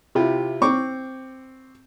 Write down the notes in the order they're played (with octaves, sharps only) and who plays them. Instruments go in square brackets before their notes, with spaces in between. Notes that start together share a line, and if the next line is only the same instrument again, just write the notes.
[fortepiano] C3 E4 F4 G4
C4 C#6 D6